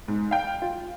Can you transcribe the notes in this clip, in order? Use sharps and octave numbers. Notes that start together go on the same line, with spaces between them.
G#2
F5 G5
F4